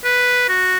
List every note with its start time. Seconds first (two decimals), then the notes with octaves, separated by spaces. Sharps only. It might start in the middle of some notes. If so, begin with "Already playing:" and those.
0.04 B4
0.49 F#4